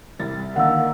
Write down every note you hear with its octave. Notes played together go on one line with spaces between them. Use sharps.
C2 G3 A6
D3 D#3 A#3 F#5 E6